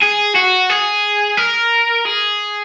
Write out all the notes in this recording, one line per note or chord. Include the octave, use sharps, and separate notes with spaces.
G#4
F#4
G#4
A#4
G#4